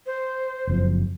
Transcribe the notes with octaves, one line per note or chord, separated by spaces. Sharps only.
C5
F#1 F2